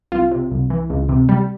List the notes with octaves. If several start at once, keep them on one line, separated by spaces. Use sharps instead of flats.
C2 F4
C3
C2
E3
C#2
C3
G3